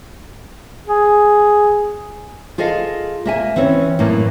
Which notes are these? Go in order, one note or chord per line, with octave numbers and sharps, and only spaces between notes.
G#4
F4 G#4 A4 D#5 F5
A#3 E5 G#5
E3 C4 C#4 C#5
F#2 A2 E3 A#3